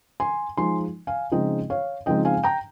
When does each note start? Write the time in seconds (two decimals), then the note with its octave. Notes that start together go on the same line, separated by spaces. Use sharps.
0.20 G#5 C6
0.57 F3 G#3 D#4 G#5 C6
1.07 F5 G#5
1.32 C#3 F3 G#3 C4 D#4 D#5 G5
1.70 C#5 F5
2.06 C#3 F3 G#3 C4 D#4 D#5 G5
2.25 F5 G#5
2.43 G5 A#5